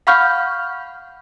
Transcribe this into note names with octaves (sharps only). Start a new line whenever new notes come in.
F5 F#5 B5 C#6 F6 G6